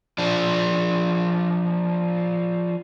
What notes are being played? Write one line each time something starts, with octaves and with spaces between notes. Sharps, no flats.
F3 D4